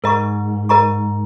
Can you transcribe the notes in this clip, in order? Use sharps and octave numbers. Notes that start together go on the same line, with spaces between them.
G#2 A#4 D#5 A#5 C#6
A#4 D#5 A#5 C#6